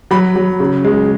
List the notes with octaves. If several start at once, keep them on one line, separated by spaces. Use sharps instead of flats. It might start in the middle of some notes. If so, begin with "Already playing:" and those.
F#3 B5
F#3
C#3
G#3